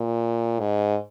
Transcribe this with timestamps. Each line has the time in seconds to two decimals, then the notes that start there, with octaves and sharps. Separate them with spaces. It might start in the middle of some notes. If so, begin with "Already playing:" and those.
Already playing: A#2
0.60 G#2